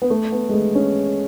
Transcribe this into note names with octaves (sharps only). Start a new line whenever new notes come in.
B3
A3
B3
G#3
A3
C#4